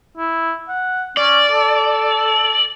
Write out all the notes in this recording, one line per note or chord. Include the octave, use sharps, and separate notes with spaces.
E4
F#5
C#4 D5
A4